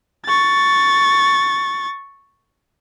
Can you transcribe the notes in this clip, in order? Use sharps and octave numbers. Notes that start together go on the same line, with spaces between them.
C#6 A6